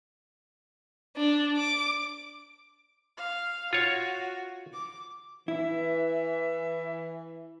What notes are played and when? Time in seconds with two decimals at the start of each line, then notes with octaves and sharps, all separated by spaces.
1.16 D4
1.56 D6
3.18 F5
3.73 F4 F#4 C#5
4.73 D6
5.48 E3 E4 E5